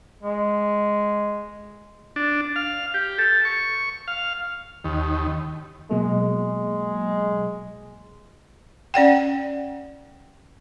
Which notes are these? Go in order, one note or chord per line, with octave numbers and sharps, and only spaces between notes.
G#3
D4
F5
G4
A4
C#6
F5
D#2
B2 F#3 G#3 A#3
C#4 D5 F#5 G5